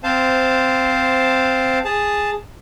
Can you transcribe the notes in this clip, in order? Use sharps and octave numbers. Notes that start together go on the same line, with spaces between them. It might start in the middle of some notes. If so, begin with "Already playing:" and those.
C4 C5 F5 A5
G#4 A5